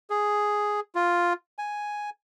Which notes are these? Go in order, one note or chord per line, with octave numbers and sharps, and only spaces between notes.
G#4
F4
G#5